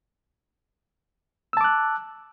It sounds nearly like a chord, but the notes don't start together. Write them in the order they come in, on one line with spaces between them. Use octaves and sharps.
E6 A5 D6 F#6